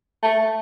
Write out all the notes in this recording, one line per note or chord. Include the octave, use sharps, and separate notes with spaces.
A3